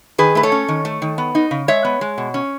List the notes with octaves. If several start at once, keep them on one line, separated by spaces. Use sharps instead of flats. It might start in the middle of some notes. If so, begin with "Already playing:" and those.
D#3 G#4 B4
A3 B4
A4 C#5
C#4
D#3
A3
D#3
B3
D#4
C#3
G#3 C#5 E5
B3
G#3
B2
C#4